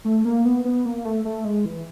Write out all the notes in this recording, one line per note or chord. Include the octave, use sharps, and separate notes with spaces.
A3
A#3
B3
B3
A#3
A3
A3
G#3
E3